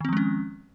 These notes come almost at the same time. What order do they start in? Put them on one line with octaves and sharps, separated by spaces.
D#3 C4 F3 G#3 C#4